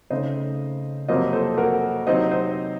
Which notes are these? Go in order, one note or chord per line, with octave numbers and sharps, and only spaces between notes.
C#3 A3 C4 D#4 C5 D#5
F2 C3 F#3 A#3 C5 D#5
A4 C5
F#4 A#4
C3 F#3 C4 D#4 C5 D#5
C5 D#5